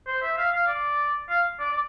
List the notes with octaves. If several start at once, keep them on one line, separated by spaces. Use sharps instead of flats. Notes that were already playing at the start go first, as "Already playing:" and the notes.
C5
E5
F5
F5
D5
F5
D5
D5